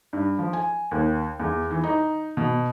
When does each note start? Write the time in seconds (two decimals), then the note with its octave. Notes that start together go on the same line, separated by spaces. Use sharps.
0.13 G2
0.38 F3
0.53 G#5
0.91 D#2
1.40 E2
1.71 E3
1.83 D#4
2.37 B2